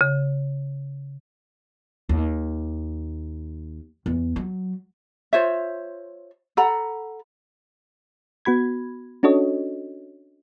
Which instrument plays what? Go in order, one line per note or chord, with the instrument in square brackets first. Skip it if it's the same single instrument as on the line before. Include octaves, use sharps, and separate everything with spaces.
[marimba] C#3
[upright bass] D#2
E2
F#3
[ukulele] F4 C5 C#5 E5
A4 F#5 A#5 B5
[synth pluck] B3 F#4 B5 G#6
C#4 D4 F#4 A4 C#5 D#5